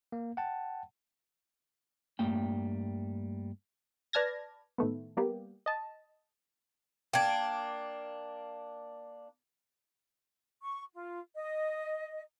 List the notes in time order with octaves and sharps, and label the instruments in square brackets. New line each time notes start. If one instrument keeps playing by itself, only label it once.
[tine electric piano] A#3
F#5 G5 A5
[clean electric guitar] G2 G3 A3 A#3 G5
[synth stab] B4 D5 A5 F6 G#6 A#6
A2 D#3 A3 B3
G3 A#3 B3 G4
D#5 A5
[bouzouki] A#3 D4 [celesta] G5 G#6
[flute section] C#6
F4
D#5